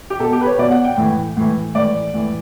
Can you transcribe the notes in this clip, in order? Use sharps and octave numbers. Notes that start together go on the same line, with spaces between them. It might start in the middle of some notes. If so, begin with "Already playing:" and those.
G4
B2 A4
G4
B4
C#5
B2 D5
F#5
G5
A2 E3
A2 E3
A2 E3 D5
A2 E3